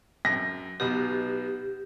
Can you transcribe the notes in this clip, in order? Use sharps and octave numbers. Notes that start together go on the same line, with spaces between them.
F#2 A#6
B1 B2 B3 G4